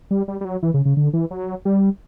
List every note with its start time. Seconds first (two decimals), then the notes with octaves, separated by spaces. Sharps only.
0.11 G3
0.28 G3
0.41 G3
0.45 F#3
0.63 E3
0.74 C#3
0.86 C#3
0.97 D3
1.13 E3
1.31 F#3
1.65 G3